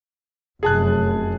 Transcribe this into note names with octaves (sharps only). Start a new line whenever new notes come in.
F1 F#2 G#4 A5 F#6